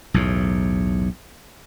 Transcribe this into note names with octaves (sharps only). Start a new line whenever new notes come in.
B1 E2 A2